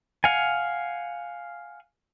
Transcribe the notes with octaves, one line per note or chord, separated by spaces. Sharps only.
F5 F#5 G#5